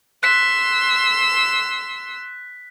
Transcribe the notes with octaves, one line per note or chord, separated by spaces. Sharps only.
C6 E6 F#6 B6